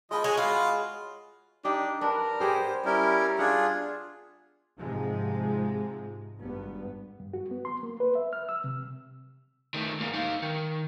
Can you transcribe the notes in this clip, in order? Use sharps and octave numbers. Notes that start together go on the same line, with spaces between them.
F3 G#3 D#5 B5
G#3 F#4 G#4 C#5
F4 F#4 F5
D4 D#4 G4
D4 A#4 B4
B3 G4 G#4 C5
G3 C#4 E4 A#4
D4 F4 G#4 E5 F#5
G#2 C3 F3 G#3
G#1 G2 B3
G2
F#4
B3
C6
A#3
B4
E5
F6
E6
C3
D#3 A3
G#2 A#3
D#4 F5
D#3